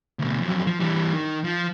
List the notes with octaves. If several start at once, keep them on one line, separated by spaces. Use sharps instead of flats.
D2 B2
F2 F#3
F3
E3 G3
D#3
F3